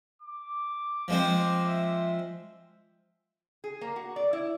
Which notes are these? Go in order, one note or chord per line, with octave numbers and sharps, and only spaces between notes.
D6
F3 G#3 C4
E5
G#4
A#3
F#4
D5
E4